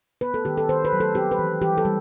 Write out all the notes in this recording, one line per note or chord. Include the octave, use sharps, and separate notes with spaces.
B3 B4
A4
D#3 G4
A4
D#3 C5
B4
F#3
A4
C4 G4
B4
E3
E3 G4
A4
G3